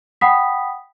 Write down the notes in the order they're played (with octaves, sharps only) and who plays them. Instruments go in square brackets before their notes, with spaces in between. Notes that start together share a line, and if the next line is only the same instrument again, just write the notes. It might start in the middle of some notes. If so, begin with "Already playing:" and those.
[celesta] F#5 G5 B5 D#6 B6